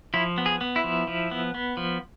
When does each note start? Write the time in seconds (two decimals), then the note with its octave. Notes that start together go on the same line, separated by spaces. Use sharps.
0.14 F3 E4
0.38 B3
0.46 G#4
0.61 B3
0.76 E4
0.84 F3
1.08 F3
1.31 B3
1.54 B3
1.77 F3